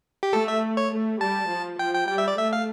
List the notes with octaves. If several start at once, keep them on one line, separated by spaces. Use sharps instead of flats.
G4
A3 A4
E5
C#5
A3
G3 A5
F3
F3 G5
G5
G3 G5
E5
D5
A3 E5
F5